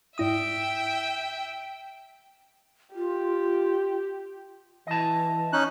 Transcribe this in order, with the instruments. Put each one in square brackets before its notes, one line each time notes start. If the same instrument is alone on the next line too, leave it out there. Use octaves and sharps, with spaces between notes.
[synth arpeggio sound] G#2 E4 D#6 [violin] E5 G5
[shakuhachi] F4 [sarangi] G4
[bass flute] E3 [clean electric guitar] D#5 A5
[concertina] C#4 D#4 F#6